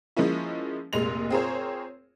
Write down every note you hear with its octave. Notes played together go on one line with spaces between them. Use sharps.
F3 G#3 A#3 C#4 E4
F1 A#2 G#3 C6 F7
C4 F4 G#4 A#4 C5 C#5